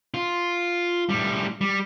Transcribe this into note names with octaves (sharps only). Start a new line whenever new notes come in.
F4
A2 G3
G3